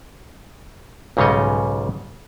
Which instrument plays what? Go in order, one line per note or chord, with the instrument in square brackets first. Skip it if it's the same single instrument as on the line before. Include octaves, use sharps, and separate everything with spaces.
[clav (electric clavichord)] B1 G#2 C#3 G3 C#5 D#5